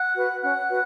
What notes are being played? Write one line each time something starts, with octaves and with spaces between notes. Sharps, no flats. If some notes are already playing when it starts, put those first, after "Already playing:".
Already playing: F#5 F#6
F#4 B4
C#4 F#5 F#6
F#4 B4